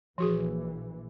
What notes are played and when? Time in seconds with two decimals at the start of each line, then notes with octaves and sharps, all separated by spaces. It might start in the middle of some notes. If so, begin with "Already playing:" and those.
0.18 A#1 E3 F3 F#4 G#4